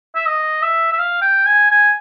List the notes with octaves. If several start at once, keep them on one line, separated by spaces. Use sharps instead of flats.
E5
D#5
E5
E5
F5
G5
G#5
G#5